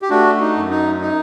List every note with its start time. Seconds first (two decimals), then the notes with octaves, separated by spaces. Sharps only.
0.02 G4
0.10 A3 D4 F#4
0.40 D#4
0.56 F#2
0.70 D#4
1.01 D#4